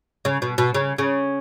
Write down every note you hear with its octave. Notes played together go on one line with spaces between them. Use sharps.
C#3
B2
B2
C#3
C#3